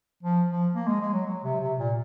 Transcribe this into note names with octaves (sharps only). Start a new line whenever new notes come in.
F3
F3
A#3
G#3
G#3
F#3
F#3
C3
C3
A#2